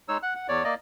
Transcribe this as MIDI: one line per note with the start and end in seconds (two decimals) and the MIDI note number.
0.08 0.18 56
0.08 0.18 63
0.08 0.18 73
0.08 0.18 88
0.23 0.34 78
0.23 0.34 90
0.36 0.47 78
0.48 0.64 40
0.48 0.64 73
0.48 0.64 74
0.64 0.75 58
0.64 0.75 74
0.64 0.75 75